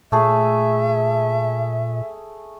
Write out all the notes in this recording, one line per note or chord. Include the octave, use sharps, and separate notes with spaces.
A#2 A3 G#4 E5